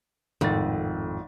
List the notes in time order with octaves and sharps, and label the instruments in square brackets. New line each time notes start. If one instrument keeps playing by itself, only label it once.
[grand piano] G#1 A6 [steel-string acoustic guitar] F2 A2